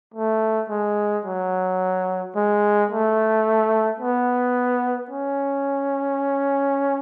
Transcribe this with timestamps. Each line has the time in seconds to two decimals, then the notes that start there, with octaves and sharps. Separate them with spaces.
0.14 A3
0.70 G#3
1.25 F#3
2.35 G#3
2.91 A3
4.00 B3
5.10 C#4